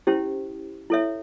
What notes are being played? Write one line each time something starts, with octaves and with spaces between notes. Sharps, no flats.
C#4 E4 G4 C5
E4 A4 C#5 E5